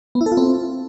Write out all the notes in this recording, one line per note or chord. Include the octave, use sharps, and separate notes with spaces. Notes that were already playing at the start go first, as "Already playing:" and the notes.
B3
E4
A4
F4
C4